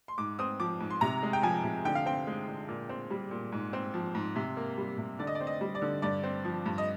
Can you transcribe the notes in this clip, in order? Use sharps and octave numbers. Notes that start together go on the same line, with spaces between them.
C6
G#2 D6
C4 D#6
F3 D6
G#2
C6
C3 A#5
G#3
G5
F3 G#5
C3
D3 G5
F5
C4 G5
G#3
D3
A#2
C4
G3
A#2
G#2
C4
F3
G#2
C3
A#3
G3
C3
D3 D5
D#5
D5
C4
D#5
G3
D5
D3
G2 D5
C4
F3
G2
D#5